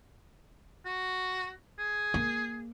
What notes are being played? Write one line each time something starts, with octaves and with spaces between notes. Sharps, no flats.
F#4
G#4
A#3